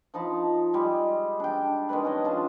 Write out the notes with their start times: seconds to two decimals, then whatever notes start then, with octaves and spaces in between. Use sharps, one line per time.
0.14 F3 D#4 A5 B5
0.73 G3 G#3
1.40 D4 G5
1.89 D#3 G#3 D4 B4
2.05 C#4 D#5
2.24 D4 F4 A5